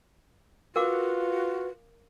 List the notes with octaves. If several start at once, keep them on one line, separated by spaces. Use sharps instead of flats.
F4 F#4 A#4 B4 F5 D6